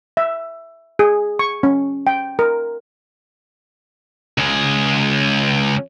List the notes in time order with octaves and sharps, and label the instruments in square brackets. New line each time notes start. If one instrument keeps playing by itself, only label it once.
[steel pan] E5
G#4
C#6
C#4
G5
A#4
[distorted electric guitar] C#2 G#4